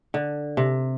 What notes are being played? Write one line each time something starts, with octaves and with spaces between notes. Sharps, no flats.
D3
C3